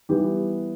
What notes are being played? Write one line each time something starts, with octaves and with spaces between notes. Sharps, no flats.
E3 G3 B3 G4